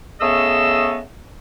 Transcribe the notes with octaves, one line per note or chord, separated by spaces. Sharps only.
C#3 A3 B3 G#4 D#5 E6